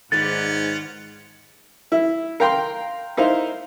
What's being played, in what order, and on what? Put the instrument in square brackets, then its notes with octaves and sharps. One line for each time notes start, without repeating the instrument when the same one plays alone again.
[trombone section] G#2 [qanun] D#3 B4 D5 [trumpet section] C#4 F4 F#5 [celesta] A6
[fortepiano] E4
A#4 F5 G5 A#5 C6
D#4 E4 A#4 C5 F5